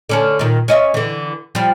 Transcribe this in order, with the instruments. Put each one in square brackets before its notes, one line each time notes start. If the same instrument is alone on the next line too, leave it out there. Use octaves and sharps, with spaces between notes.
[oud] D3 C#4 A4
A#2 D#3
C#4 D#5 E5
D3 E3
F3 G3